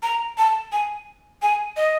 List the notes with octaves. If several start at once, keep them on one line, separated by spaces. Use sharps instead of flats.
A#5
A5
G#5
G#5
D#5